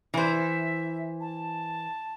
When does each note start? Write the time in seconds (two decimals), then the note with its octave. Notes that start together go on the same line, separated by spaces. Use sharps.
0.14 E3 C5 E5
1.20 A5